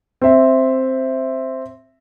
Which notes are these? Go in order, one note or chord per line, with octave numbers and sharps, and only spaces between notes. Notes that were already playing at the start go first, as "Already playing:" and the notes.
C4 E5